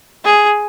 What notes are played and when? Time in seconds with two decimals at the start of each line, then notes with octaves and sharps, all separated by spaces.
0.25 G#4